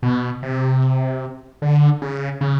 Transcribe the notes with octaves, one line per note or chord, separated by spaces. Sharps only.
B2
C3
D3
C#3
C#3